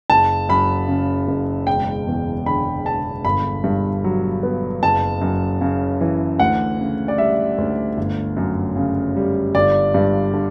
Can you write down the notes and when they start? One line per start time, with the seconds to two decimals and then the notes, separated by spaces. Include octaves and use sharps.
0.10 F#1 A5
0.49 F#2 B5
0.88 C#3
1.28 F#1
1.67 E1 G5
2.07 E2
2.46 D3 B5
2.86 E1 A5
3.25 G1 B5
3.64 G2
4.04 F#3
4.43 B3
4.83 F#1 A5
5.21 F#2
5.61 C#3
6.01 E3
6.39 D2 F#5
6.79 C#3
7.08 D5
7.18 G3 E5
7.58 D2
7.97 G1
8.37 F#2
8.76 C#3
9.16 G3
9.55 G1 D5
9.94 G2
10.33 D3